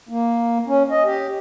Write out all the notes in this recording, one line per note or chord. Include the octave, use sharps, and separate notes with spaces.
A#3
C#4
D#5
G4